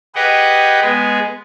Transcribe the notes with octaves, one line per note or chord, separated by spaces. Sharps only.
G4 G#4 B4 D#5 F#5 G5
G#3 B3 G#4